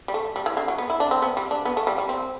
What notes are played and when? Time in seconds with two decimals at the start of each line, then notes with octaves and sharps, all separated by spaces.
0.08 G3
0.14 A3
0.36 G3
0.46 E3
0.57 D3
0.68 F#3
0.78 B3
0.90 E4
1.00 D4
1.11 C4
1.22 B3
1.37 G3
1.51 D4
1.65 B3
1.77 A3
1.87 G3
1.98 G3
2.09 C4